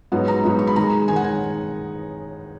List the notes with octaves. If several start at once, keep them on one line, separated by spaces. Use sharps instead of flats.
G#2 F#3 B3 D#4 F#5
A#5
G#2 F#3 B3 D#4
C#6
B5
D#3 G#3 D#4 A#5
D#3 G#3 D#4 G#5
F#5
G#5